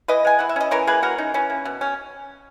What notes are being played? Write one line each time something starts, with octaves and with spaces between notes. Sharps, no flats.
E3 B4 D#5
G#3 G#5
E3 F#5
E5
C#4 D#5
E3 A#4 C#5
A#3 G#4 B4
E3 F#4 A#4
C#4 D#4
E3 C#4
A#3
B2
C#4